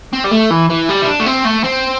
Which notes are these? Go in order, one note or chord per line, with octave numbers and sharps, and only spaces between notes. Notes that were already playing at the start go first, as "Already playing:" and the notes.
C4
G3
A3
E3
E3
G3
E4
D4
A3
C4
A3
C4